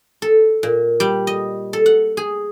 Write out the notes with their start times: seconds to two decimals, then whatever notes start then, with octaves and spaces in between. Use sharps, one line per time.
0.22 A4
0.63 A#2
1.00 G3
1.27 D#5
1.73 A4
1.86 F#5
2.17 G#4